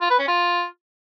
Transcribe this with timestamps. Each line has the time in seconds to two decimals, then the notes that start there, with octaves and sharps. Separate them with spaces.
0.01 F4
0.10 B4
0.19 C#4
0.28 F4